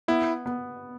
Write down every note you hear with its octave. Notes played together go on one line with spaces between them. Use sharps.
B3 E4
B3